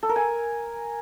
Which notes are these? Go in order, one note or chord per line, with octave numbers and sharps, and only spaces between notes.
A4
A#4
G#5